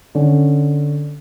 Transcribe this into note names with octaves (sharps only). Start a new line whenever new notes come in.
D3 C#4